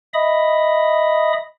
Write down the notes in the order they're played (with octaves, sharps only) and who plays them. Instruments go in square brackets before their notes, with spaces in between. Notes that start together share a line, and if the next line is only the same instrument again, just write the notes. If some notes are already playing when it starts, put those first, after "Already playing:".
[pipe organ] D#5 E5 B5 D#6